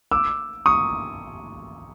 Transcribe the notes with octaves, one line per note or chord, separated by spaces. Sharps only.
D6 E6
C#6 D#6